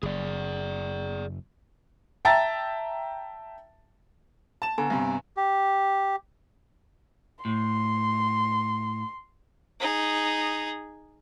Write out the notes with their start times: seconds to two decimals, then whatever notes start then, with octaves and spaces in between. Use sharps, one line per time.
0.03 F#1 G#4 D5
2.25 E5 G5 A5 A#5 A6
4.62 A5 E7
4.78 D3 B3 G#5 A#5
4.90 G2 C3
5.37 G4
7.45 A2 C6
9.80 D#4 G#4